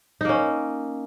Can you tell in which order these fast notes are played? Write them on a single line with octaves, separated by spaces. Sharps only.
D#4 A#3 C#4